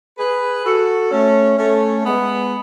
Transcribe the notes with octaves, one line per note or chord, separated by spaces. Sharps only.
G#4 B4
F#4 A4
A3 C#4
A3 C#4
G#3 B3